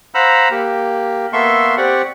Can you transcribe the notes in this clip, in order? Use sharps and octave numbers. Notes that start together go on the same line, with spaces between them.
C5 F5 F#5 A#5 B5 E6
A#3 G4
A#3 B3 A4 E5 C6 C#6
C4 G4 D5 F#5 C#6